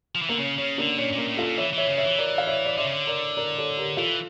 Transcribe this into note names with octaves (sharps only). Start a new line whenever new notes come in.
F3
E3
D3 A#3
C#3 C#4
C#3 C#4
D3 A#3 D4
A#2 C#4
A#2 A#3
A2
F4 A4
A#2
E3 C#5 E5
E3 C#5 E5
C#3
C#5 E5
E3
A#4 D5
F5
C#5 E5
D5
D3 C#5 E5
C#3
D3
A#4 D5
A#4 D5
A4 C#5
G4 A#4
E3 F4 A4